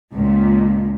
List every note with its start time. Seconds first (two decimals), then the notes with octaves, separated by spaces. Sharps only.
0.12 C#2 A#2